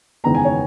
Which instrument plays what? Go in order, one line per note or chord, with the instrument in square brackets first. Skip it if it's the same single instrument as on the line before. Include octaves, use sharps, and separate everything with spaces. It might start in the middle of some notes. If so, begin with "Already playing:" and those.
[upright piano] F#1 E2 D#3 G#3 B3 A#5
G#5
C#5